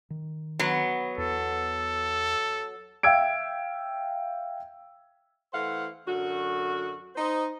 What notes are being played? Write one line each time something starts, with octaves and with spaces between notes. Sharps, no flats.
D#3
F#3 B3
E2 A4
E5 F5 G5 E6 G#6 D7
E3 A3 C5 F5 F#5
F#2 D3 F#4
D#4 C5